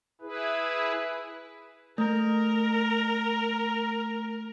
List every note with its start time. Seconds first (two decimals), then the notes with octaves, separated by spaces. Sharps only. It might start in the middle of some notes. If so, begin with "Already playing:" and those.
0.21 E4 G#4 B4
1.98 A3 A#4